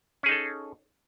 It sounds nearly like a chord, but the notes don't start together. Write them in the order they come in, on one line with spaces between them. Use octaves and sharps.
C#4 G#4 D#4 A4